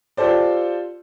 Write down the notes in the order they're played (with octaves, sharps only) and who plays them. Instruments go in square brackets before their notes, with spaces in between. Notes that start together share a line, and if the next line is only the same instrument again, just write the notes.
[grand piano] F4 G4 A4 C5 D5